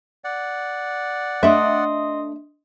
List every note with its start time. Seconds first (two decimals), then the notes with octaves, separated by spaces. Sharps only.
0.24 D5 F#5
1.43 A3 D4 D#5 E5 C6 D#6